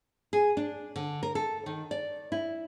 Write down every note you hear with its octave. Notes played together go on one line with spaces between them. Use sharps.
G#4
D4
D3
A#4
A4
D#3
D5
E4